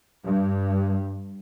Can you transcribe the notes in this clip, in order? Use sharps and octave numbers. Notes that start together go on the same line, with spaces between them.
G2